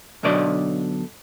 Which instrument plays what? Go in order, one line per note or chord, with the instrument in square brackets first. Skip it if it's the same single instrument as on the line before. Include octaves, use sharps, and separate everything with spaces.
[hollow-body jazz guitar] B1 B2 D3 F#3 D5 D#5